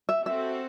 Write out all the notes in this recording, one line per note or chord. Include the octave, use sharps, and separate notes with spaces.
E5
C4 F#4 A4 E5